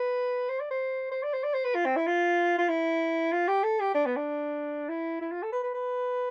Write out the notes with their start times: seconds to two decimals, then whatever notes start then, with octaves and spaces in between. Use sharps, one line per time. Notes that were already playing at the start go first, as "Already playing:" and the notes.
Already playing: B4
0.49 C5
0.60 D5
0.71 C5
1.12 C5
1.23 D5
1.33 C5
1.44 D5
1.54 C5
1.65 B4
1.74 F4
1.85 C4
1.96 E4
2.07 F4
2.58 F4
2.69 E4
3.32 F4
3.48 G4
3.64 A4
3.80 G4
3.95 D4
4.06 B3
4.16 D4
4.89 E4
5.21 E4
5.31 F4
5.42 A4
5.52 B4
5.63 B4
5.74 B4